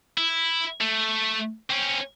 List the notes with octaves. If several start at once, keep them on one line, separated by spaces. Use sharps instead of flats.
E4
A3
C4 C#4